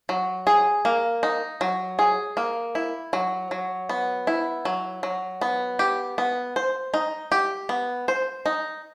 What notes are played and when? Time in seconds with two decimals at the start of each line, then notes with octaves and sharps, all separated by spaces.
0.09 F#3
0.47 G#4
0.85 A#3
1.23 D#4
1.61 F#3
1.99 G#4
2.37 A#3
2.75 E4
3.13 F#3
3.51 F#3
3.89 B3
4.27 E4
4.65 F#3
5.03 F#3
5.41 B3
5.79 G4
6.18 B3
6.56 C5
6.94 D#4
7.32 G4
7.69 B3
8.08 C5
8.46 D#4